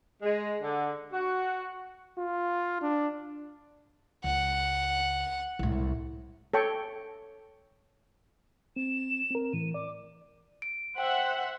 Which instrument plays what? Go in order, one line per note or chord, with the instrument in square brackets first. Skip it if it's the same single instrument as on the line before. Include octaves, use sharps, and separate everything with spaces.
[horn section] G#3
D3
F#4
[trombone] F4
D4
[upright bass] C#2 [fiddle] F#5
[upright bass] C2 A2
[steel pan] A4 C#5 G5 C#6
[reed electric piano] C4 [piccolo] E7
[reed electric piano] C4 A#4
[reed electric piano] A2 E3 [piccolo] D#7
[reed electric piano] D5 [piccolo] D6
[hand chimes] D7
[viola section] C5 E5 F#5 [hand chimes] G5